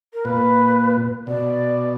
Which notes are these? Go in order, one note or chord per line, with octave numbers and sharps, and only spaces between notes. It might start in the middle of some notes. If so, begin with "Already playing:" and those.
A#4
A#2 B4
B2 D5